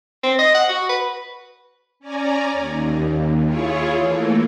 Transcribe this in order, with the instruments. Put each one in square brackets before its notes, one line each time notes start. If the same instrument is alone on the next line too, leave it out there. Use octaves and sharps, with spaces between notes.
[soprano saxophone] C4
D#5
F#5
F#4
B4
[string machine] C#4 D5 G#5 A#5
D#2
E4 F4 G#4 C#5
E3 A3 A#3